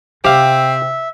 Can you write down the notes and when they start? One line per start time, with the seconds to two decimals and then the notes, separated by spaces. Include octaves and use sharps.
0.25 C3 C4 G4 E5 F5